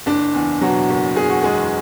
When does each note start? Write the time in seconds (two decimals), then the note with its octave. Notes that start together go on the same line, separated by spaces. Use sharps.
0.06 F#1 D4
0.34 E2
0.61 B2 F#3 F#4
0.89 F#1
1.16 F#1 G#4
1.30 F#4
1.43 E2 G#3 G#4